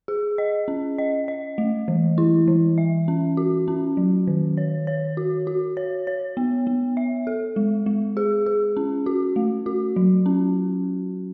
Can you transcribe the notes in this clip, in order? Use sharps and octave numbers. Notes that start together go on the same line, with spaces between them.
G#4
D#5
C#4
D#5
D#5
A3
E3
E4
E3
E5
C#4
F#4
C#4
F#3
D#3
C#5
C#5
F#4
F#4
C#5
C#5
B3
B3
E5
A4
G#3
G#3
G#4
G#4
C#4
F#4
A3
F#4
F#3
C#4